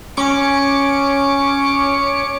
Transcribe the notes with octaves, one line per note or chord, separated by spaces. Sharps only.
C#4 D6 C#7